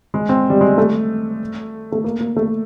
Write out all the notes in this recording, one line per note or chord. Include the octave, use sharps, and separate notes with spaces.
G#3
C4
G3
G#3
A3
A3
A#3
A#3
A3